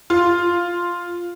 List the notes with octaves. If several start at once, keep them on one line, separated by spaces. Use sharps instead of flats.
F4